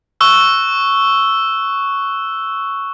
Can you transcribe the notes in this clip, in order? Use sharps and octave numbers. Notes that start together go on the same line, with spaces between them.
C#6 E6 F#6